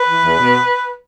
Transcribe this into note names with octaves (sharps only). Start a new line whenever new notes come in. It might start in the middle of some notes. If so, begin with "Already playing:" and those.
Already playing: B4
E3
E2
B2